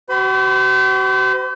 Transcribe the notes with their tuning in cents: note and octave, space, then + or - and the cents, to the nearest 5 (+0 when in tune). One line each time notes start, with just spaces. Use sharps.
F#4 +40 C5 -40 B5 +20